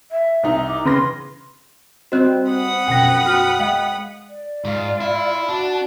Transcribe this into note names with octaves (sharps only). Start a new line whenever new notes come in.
E5
C2 D#4
D6
C#3 B4 C6 A#6
G3 C4 F#4 C5 D#5 F#6
F#5 B5 D#6
F#2 B2 F3 G5 A#6
F#4 G5 F6
G#3 D#5 F5 G5
D5
G#2 F4
E4
D4 F#4 A5